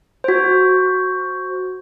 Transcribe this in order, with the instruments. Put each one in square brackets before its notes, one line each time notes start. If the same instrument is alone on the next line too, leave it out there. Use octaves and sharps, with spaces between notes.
[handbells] F#4 C5